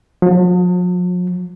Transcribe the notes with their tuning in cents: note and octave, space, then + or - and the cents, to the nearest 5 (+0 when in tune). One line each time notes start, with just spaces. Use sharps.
F3 +45